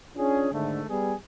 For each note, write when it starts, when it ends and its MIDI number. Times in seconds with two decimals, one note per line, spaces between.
0.17 0.51 61
0.17 0.51 62
0.17 0.51 65
0.17 0.51 68
0.51 0.83 44
0.51 0.83 50
0.51 0.83 51
0.51 0.83 57
0.88 1.13 55
0.88 1.13 59
0.88 1.13 68